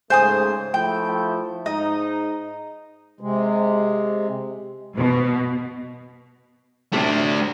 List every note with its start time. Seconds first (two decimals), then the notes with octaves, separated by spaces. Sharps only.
0.10 G#2 C#3 A3 C5 G#5 D#6
0.74 F3 A3 E4 G5
1.66 G#2 D#4 D#5
3.21 C3 G#3
4.98 B2
6.93 A2 C3 A3 D4